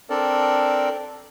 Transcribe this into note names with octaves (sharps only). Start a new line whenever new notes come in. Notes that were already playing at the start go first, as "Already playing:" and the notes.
C4 D4 A4 A#4 D5